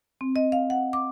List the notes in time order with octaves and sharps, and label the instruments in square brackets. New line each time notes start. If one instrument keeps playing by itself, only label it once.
[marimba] C4
D#5
F5
F#5
D6